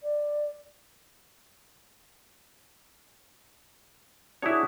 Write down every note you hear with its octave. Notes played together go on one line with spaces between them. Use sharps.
D5
D4 E4 F#4 G#4 C#5